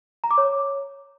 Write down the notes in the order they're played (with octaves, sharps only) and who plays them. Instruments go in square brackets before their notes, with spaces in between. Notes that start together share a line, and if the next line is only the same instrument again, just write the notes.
[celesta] A#5
D6
C#5